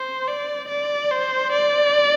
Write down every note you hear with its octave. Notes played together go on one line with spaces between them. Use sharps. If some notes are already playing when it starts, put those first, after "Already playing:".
Already playing: C5
D5
D5
C5
D5